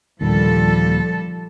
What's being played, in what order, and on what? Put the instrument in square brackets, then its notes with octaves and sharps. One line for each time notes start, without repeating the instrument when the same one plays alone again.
[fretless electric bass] D#2 A#2 D3 [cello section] F3 G3 A4